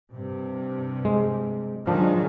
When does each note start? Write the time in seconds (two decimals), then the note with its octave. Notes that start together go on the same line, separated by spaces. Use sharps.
0.12 G2 C3
1.05 G#3
1.87 D#3 F3 F#3 G#3 D4